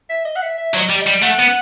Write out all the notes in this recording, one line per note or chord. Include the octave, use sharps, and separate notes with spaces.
E5
D#5
F#5
E5
E5
F#3 C5
D#5
G3
D#5
G3
A3 F#5
B3